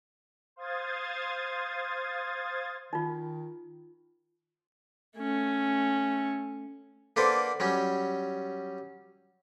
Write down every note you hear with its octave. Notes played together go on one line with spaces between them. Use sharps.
C5 F5 C6 D#6 G#6 A6
D#3 D#4 F4
A3 C#4
A#3 D4 A4 B4 C5 F#5
F#3 G3 C#4